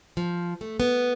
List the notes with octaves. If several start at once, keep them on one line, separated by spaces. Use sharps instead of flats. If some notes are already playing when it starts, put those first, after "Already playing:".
F3
A3
B3